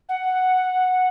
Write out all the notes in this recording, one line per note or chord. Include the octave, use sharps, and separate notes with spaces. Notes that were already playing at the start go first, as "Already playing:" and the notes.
F#5